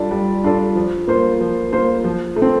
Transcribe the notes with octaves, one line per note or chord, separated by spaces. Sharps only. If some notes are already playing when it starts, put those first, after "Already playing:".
Already playing: G3 D4 F4 A4 D5
G3
D4 F4 A4 D5
F3
A#3 F4 C5
F3
A#3 F4 C5
F3
A3
C4